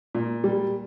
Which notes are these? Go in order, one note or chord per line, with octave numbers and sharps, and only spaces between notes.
A#2
G3